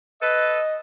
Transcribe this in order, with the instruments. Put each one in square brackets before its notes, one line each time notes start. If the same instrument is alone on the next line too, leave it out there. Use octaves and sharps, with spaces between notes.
[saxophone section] A4 B4 [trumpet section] D#5